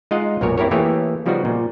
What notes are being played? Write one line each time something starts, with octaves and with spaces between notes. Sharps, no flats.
G#3 D#4 F4 D#5 F5 F#5
B1 F#2 A#2 F#4 A#4 C#5
C4 E4 G4 A#4 C#5
E3 A3 A#3 G4 G#4 C#5
C#3 F3 G3 B3 D#4 F#4
A#2